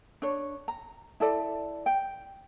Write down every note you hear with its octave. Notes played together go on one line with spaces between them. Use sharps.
D4 C#5
A#5
E4 A4 D5
G5